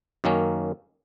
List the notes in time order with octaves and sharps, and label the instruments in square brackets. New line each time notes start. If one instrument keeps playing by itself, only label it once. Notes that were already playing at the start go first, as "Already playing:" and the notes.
[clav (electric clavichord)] F#2 D#3 A#3 C#4